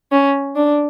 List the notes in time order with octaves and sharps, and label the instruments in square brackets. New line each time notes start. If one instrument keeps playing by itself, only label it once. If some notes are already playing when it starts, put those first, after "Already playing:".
[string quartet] C#4
D4